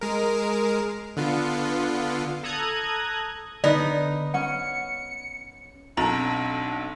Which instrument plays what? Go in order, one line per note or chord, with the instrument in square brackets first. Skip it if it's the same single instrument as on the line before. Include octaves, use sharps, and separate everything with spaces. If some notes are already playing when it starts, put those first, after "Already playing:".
[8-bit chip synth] G#3 A#4
D3 B3 F4
[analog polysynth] A4 A#5 D#6 F#6 G#6
[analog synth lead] D3 [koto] B3 D#4 [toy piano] D5
[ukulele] C#4 F#5 [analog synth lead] C#7
[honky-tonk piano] B1 A4 [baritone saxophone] D3 [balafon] C4 [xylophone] A#5